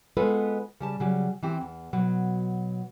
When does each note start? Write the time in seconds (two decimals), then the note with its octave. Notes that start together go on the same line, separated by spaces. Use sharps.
0.17 G#3 B3 F4 A4 B4
0.80 C#3 G3 A5
1.00 C#3 F#3 G3
1.43 E3 C4 G4
1.61 E2
1.93 B2 F#3